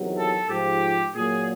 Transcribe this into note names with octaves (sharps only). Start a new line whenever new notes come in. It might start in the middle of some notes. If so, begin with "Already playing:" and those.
Already playing: E2 C3 D#3 F#3
A4
G#2 F3 G4
A#2 F#3 G#4